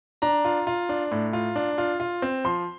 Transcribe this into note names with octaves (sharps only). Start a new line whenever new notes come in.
D4 A#5
F4
F4
D4
A2
F4
D4
F4
F4
C4
F3 C6